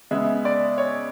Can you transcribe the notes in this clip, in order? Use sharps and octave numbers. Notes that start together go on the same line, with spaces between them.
C#3 G#3 B3 E5
D5
C#5